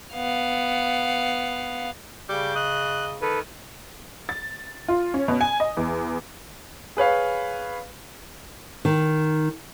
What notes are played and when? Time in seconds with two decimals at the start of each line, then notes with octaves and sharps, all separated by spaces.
0.15 B3 F5
2.29 C#3 G3 D6 G6
2.56 D#5 F#6
3.22 D#3 A4 B4
4.29 A6
4.88 F4
5.14 C#4
5.28 B2
5.41 G#5
5.60 D#5
5.77 E2
6.97 G#4 B4 C#5 F5
8.85 D#3